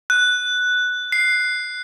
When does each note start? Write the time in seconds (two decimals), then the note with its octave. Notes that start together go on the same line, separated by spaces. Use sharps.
0.10 F#6
1.12 C7